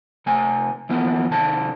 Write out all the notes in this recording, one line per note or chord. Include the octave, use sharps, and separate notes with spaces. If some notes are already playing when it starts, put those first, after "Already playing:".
C3 A3 G#5
E3 F3 A#3 B3
C3 D#3 A5